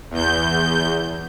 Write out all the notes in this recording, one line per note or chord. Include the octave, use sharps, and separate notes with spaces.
E2 G6